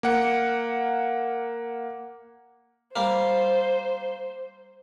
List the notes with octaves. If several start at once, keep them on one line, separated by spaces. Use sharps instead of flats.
A#3 F#5 C#7
G3 A#3 C5